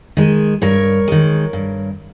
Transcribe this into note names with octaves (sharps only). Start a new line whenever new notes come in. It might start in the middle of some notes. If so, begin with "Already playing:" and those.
D#3 G#3
G2 A#4 C#5
D#3 G#3
G2